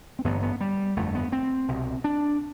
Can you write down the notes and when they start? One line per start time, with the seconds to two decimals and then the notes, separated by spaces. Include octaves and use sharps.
0.19 C4
0.24 A1 G2 D3 B3
0.43 B3
0.61 G3
0.96 G1 F2 D3 A3
1.15 B3
1.32 C4
1.68 C2 B2
2.04 D4